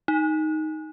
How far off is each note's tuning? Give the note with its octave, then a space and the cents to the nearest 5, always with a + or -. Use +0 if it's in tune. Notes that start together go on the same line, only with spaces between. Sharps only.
D#4 +5